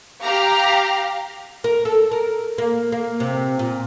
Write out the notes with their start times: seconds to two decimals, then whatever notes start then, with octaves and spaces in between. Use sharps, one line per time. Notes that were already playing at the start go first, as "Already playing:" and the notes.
0.22 G4 F5 A#5
1.64 A#4
1.85 A4
2.11 A#4
2.58 A#3
2.92 A#3
3.20 C3
3.59 A#2